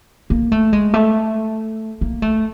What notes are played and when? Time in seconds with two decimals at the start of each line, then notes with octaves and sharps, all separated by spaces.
0.30 A#3
0.52 A3
0.73 G#3
0.93 A3
2.01 A#3
2.22 A3